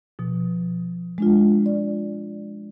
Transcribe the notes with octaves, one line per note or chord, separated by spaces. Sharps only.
B2 F3
G#3 D4 F4
D5